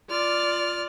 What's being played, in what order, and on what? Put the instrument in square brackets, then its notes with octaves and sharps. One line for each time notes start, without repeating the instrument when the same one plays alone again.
[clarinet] F4 [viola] D5 [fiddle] F6